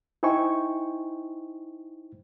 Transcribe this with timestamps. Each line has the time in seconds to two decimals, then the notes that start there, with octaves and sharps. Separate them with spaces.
0.23 D#4 E4 C5 G5 G#5 C#6